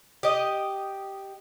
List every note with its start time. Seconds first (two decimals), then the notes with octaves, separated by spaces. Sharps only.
0.23 G4 D#5